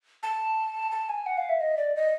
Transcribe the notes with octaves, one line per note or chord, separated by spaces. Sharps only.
A5
A5
G#5
F#5
F5
E5
D#5
D5
D#5